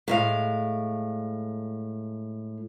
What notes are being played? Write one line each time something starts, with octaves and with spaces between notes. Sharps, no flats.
A2 G#3 F5